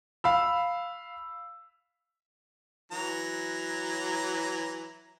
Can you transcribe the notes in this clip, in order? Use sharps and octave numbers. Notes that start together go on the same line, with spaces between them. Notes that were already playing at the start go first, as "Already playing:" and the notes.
F5 B5 E6
E3 F#3 A#5